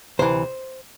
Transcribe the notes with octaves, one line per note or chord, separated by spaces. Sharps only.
D2 C3 E3 C5